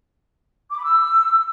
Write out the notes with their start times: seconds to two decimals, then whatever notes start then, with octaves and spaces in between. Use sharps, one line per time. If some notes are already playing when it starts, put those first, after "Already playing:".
0.71 D6
0.77 B5
0.82 E6